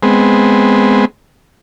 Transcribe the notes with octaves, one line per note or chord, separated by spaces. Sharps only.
G#3 B3 C4